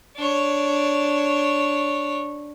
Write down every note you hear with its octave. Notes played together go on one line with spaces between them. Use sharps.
D4 C#5